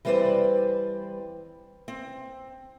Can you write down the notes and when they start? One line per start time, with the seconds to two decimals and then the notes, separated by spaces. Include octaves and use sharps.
0.05 E3 G3 C4 B4 C5 D5
1.88 C4